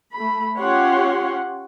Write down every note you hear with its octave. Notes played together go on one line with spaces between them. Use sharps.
A3 B5
C#4 F4 G4 C#5 F#5 C6